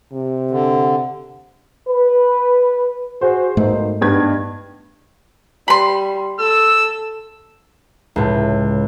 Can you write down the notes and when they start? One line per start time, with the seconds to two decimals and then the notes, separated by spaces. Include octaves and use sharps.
0.12 C3
0.51 D3
1.88 B4
3.21 F#4 G#4 C5
3.57 G#2 B2 A3 A#3 D#4
4.01 G2 B3 D#4 G#6
5.68 G3 B5 C6
6.39 A4 E6
8.16 C#2 A2